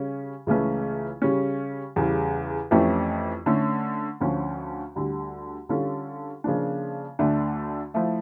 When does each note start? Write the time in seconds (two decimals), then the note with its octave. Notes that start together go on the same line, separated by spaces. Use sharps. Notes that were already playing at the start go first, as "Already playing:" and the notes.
Already playing: C#3 G3 C#4
0.47 C#2 C#3 E3 A3 C#4
1.22 C#3 G3 C#4
1.96 E2 C#3 G3
2.71 F2 E3 A3 C#4 G4
3.46 D3 A3 C#4
4.21 D2 D3 F3 C#4
4.96 D2 D3 G3
5.69 D3 G3 C#4 F4 A4
6.44 C#3 F3 A#3 D4
7.19 D2 D3 A3 D4
7.94 F3 A3 E4